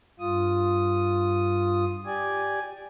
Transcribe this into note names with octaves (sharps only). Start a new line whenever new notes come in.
G2 F4 D#6
G4 D5 G#5